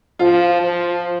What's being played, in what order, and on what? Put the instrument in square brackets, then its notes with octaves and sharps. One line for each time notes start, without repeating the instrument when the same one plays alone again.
[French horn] F3 [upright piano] F4
[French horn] F3